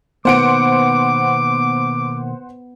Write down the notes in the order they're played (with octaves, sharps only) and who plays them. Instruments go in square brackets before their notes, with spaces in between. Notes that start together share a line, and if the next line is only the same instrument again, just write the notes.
[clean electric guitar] B2 D#3 A#3 [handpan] B3 [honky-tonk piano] C5 F#5 D7 [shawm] D6